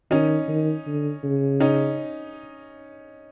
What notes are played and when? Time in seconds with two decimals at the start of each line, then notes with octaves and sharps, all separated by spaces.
0.11 D#3 C#4 D#4
0.48 D#3
0.87 D3
1.24 C#3
1.60 C#4 D#4